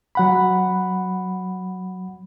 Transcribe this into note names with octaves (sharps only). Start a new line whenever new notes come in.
F#3 F#5 B5